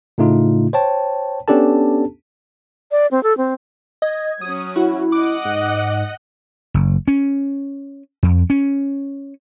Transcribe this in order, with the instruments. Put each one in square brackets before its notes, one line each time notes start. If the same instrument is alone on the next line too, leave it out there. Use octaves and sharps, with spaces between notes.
[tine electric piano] A2 C#3 A3 D#4 F4
C5 C#5 G5 A5
B3 C#4 D4 G4 A4 A5
[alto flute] D5
C4
A4
C4
[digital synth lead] D#5 [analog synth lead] G#6
[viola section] F#3 C#4 [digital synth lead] D#6
[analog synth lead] E4 [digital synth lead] F#4
[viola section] D#5 F#5 [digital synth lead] D6
[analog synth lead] G#2
[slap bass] F#1
C#4
F2
C#4